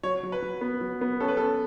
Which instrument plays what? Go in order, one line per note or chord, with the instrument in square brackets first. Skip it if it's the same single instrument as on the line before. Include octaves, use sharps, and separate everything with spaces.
[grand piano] F#3 [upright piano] C#5
[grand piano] F#3
[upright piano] B4
[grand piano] F#3
B3
F#3
B3
[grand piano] C#4 [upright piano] A4
[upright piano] B4
[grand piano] C#4 [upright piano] A4